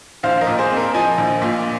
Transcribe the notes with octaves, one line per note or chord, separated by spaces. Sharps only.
A#1 C5 F5
A#4 D#5
A#2
G#4 C5
C4
A#4
F3 D#5 G#5
A#1
A#2